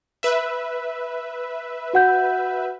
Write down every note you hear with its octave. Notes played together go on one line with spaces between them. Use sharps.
B4 E5
F#4 F#5 G6